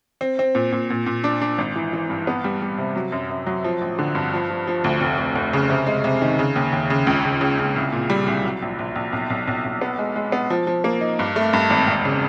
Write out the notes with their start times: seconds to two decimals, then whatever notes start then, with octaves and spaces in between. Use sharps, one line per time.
0.21 C4
0.39 C4
0.55 A#2
0.72 A#2
0.90 A#2
1.06 A#2
1.24 D4
1.41 D4
1.58 G#1
1.76 E3
1.93 E3
2.10 G2
2.27 B3
2.44 G3
2.62 G3
2.78 C3
2.96 F#3
3.12 F#2
3.30 F#2
3.46 F#3
3.64 F3
3.81 A1
3.99 D3
4.15 G2
4.33 F3
4.50 F3
4.67 F3
4.84 D2
5.01 F1
5.18 F1
5.36 F1
5.53 C#3
5.70 C3
5.86 G#3
6.04 C3
6.22 D#3
6.39 C#3
6.56 D#2
6.72 D#2
6.90 C#3
7.07 C#2
7.25 C#3
7.41 C#3
7.59 C#3
7.76 C2
7.92 A#2
8.10 G3
8.26 C2
8.44 F#3
8.62 A#1
8.79 A#1
8.96 A#1
9.13 B1
9.30 B1
9.48 B1
9.65 B1
9.81 B3
9.99 G#3
10.16 G#3
10.32 B3
10.50 F3
10.67 F3
10.84 A#3
11.01 D#4
11.19 G2
11.36 A3
11.53 G2
11.70 G#1
11.87 E1
12.05 C#3